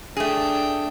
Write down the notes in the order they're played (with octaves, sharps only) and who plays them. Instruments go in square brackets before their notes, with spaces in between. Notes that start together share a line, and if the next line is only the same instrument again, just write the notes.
[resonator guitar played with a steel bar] A3 G#4 [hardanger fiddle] D4 G5